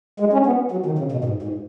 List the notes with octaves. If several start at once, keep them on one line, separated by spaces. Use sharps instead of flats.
G#3
C#4
B3
F#3
D#3
C#3
B2
G#2
G#2